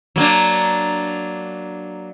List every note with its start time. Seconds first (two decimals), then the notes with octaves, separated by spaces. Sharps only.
0.16 F#3 A#3 D4